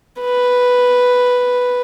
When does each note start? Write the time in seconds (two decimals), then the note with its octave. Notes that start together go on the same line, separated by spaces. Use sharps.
0.22 B4